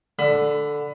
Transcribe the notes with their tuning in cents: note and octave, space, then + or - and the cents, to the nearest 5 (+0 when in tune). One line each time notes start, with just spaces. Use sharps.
D3 +0 B5 +25